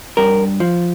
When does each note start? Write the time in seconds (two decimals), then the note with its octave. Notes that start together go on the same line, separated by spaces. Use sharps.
0.17 G2 A#4
0.60 F3